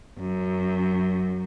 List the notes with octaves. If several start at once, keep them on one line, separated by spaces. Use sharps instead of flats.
F#2